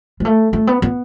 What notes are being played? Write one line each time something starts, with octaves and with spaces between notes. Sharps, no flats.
G#3
A3
A3
B3
B3